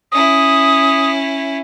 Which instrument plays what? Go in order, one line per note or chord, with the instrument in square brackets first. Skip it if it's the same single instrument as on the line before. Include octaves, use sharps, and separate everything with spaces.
[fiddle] C#4 E4 [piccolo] D#6